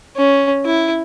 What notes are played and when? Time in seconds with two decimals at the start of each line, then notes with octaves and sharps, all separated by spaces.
0.16 C#4
0.65 E4